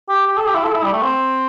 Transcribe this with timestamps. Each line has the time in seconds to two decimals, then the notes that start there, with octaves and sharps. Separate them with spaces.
0.09 G4
0.27 G4
0.37 A4
0.46 G4
0.54 E4
0.64 A4
0.73 E4
0.83 G3
0.93 A3
1.02 C4